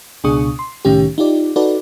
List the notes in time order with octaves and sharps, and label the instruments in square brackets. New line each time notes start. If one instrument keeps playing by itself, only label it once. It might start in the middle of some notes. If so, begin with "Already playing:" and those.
[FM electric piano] C#2 B2 D4 G#4 C#6 D#6
C6
C2 A2 D#3 C#4 G4
D#4 F4 G4 D5
D#4 F#4 A4 B4 D5